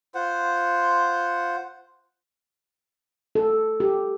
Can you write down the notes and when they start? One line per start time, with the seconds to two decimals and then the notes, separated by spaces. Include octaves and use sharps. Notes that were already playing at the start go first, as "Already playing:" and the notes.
0.15 F4 C5 F#5
3.35 A4
3.80 G4